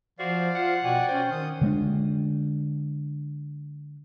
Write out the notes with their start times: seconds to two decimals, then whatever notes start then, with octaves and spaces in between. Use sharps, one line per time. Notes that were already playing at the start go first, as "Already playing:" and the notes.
0.19 F3 F#4 C5 D5 F5
0.55 F4 F#5
0.84 B2 F#4 D5 G5 G#5
1.08 C#4 C5
1.31 D#3 D#6
1.61 D3 G#3 C4 D4